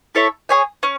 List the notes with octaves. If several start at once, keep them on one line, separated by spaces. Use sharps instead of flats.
E4 A4 C#5 E5
G#4 C#5 G#5
C#4